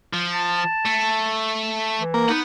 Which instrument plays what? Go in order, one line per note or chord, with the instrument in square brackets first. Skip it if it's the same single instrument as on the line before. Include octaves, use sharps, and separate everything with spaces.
[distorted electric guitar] F3
[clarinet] A5
[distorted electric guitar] A3
[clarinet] E3
[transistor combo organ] A#3
[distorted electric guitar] B3 F#5 [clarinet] D#4